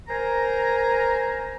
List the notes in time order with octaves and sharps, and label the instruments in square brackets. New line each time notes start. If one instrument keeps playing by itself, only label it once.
[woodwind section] A#4 C5 G#5 A#5